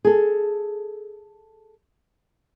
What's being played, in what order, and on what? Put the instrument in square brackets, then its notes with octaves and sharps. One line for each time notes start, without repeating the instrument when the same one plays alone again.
[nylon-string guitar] G#4 A4